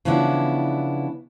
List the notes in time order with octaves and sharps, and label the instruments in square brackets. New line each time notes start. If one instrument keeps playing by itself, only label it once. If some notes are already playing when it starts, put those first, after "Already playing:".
[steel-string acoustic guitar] C#3 E3 F3 B3 D4 E4